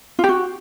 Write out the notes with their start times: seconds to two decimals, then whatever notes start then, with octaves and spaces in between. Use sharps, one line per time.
0.19 F4
0.24 G4
0.29 F#4